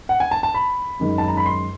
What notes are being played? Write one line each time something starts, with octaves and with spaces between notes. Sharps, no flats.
F#5
G#5
A5
A5
B5
F#2 D#3 G#3
A5
A#5
B5
C6